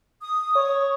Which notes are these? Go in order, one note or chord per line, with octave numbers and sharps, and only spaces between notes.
D#6
C#5